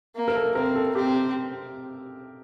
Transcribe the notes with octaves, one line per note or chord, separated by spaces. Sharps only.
A#3
A#4
A4
C4 A#4
A4
C4 G4